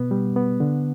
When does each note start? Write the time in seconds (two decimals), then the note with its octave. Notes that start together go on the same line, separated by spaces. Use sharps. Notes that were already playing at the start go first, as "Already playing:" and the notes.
Already playing: B2 B3
0.11 G3
0.36 B3
0.60 D3